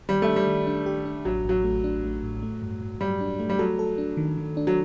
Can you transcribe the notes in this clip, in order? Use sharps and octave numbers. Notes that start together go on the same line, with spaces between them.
D#3 G3
A3
D4
G3
D#3
D4
G4
D4
A1 F#3
A1 F#3
A3
D4
A3
A2
A3
G2
G2
F#3 G3
D4
A3
G3
F#3 A4
A4
D4
D#3
D#3
D4
F#3